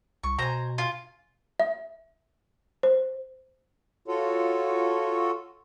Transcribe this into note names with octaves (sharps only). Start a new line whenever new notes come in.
C2 C#6
B2 C5 G#5 A#5
F4 G#5
E5
C5
F4 F#4 A4 C#5